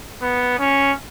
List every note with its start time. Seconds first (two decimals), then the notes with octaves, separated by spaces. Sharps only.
0.22 B3
0.59 C#4